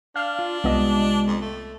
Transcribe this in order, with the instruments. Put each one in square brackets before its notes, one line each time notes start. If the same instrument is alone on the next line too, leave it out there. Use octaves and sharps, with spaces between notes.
[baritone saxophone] D4 [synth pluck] F5 F6
[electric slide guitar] F4
[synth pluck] C2 B3 D#5 [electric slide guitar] G#3 F4 G4
[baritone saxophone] F2
A3